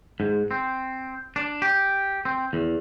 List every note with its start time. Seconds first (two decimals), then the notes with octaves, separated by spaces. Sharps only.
0.20 G#2
0.51 C4
1.36 D4
1.62 G4
2.25 C4
2.53 E2